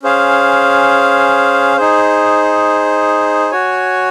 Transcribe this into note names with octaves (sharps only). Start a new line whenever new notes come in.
C#4 G#4 C5 F5
D#4 G#4 C5
F#4 C#5 G#5